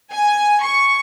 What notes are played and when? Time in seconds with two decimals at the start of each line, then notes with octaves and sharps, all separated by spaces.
0.12 G#5
0.64 C#6